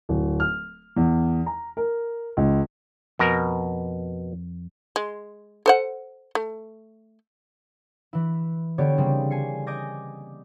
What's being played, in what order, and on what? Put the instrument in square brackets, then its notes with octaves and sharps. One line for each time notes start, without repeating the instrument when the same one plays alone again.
[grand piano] D1
F6
E2
A#5
A#4
C#2
[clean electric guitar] F2 [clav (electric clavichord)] B2 A#4
[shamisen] G#3
A4 C5 F#5
A3
[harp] E3 E4
D3 B3 G4 C#5 D5
C#3 G3 A#3 C4
G#5 C7 C#7
D#5 G#5 D6 G6 A#6